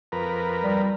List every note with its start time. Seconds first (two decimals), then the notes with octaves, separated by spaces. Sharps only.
0.12 F2 A#4 B4
0.63 G3